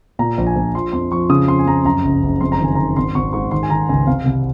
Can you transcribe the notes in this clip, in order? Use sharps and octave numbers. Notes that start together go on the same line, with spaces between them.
A#2 A#5
A#1
G#5
A#1
F3 C6
F2 C6
F3 C#6
C#3 D#6
F2 C6
G#5
F2 A#5
F#2 A#5
F#1
F#1
F2 C6
A#5
D#3 G#5
D#3 A#5
G#1 C6
G#1 C#6
G#2 C#6
D#3 C6
G#5
D#3 A#5
C#2 G#5
C3 F5
C2